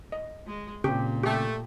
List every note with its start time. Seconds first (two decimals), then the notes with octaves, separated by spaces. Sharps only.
0.12 D#5
0.46 G#3
0.84 A#2 C#3 C4 G4
1.23 A3 G4